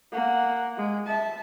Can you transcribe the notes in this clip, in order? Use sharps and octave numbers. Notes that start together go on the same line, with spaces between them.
A#3 F#5
G#3
E5 A5